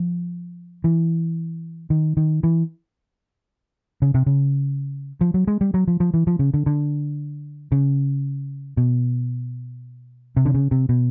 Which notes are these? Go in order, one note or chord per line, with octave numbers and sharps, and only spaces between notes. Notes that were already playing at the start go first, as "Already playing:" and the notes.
Already playing: F3
E3
D#3
D#3
E3
C#3
C3
C#3
F3
F#3
G#3
G3
F#3
F3
F3
E3
F3
C#3
D3
D3
C#3
B2
C3
D3
C#3
C3
B2